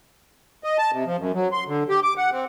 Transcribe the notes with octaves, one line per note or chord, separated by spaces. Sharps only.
D#5
A5
C3
F3
F#2
F#3
C6
D3
G4
D6
F#5
C4